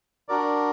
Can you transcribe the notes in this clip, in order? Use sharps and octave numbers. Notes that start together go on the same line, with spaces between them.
D4 F#4 A#4 D5